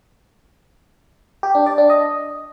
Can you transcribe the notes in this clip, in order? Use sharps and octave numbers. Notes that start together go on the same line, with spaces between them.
G4
D4
D5
D4
D#5